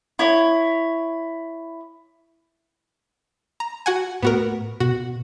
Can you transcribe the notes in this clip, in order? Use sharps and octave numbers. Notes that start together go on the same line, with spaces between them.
E4 C#5
A#5
F#4 F#5 G#5
A2 B3 F#4 A#4
B2 F#4